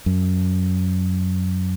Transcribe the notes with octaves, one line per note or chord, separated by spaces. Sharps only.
F#2